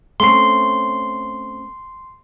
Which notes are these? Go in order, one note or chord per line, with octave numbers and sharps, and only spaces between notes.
A3 C4 C#4 C6 C7